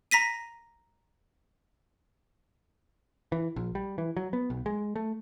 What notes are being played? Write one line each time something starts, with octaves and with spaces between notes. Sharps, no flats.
A#5 A#6 B6 D#7
E3
A#1
G3
E3
F#3
B3
B1
G#3
A3